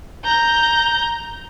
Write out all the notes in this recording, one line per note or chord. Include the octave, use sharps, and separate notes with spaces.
A#5 G6